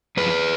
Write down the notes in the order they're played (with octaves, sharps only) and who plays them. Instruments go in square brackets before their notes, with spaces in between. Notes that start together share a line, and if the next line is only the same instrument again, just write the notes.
[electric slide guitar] F#2 F3 G#4 B4